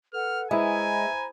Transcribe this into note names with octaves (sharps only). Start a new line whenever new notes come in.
A4 B4 F#5 F6
G#3 E4 B4 C5 E5 G#5 A#5 B5